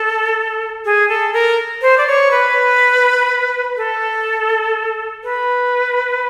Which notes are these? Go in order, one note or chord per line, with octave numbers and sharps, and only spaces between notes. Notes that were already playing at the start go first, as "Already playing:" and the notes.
Already playing: A4
G#4
A4
A#4
C5
D5
C#5
B4
A4
B4